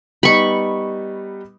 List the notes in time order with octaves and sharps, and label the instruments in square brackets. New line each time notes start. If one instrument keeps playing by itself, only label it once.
[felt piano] G3 B3 D#4 [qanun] B5 C#6